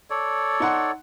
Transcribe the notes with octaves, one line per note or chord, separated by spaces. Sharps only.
A4 C#5 D5
D#4 F#5 C6